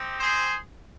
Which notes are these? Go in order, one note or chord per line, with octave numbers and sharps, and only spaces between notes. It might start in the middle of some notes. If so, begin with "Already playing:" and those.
Already playing: C4 D#4 G4
G#4 C5